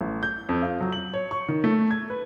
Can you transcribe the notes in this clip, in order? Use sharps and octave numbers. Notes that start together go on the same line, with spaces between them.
A1
G6
F2
F4
F#3
F#7
C#5
C#6
D#3
A3
G#6
B4